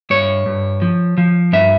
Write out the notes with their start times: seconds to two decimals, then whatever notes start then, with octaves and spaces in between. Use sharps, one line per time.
0.10 G2 C#5
0.46 G2
0.82 F3
1.18 F3
1.53 G2 E5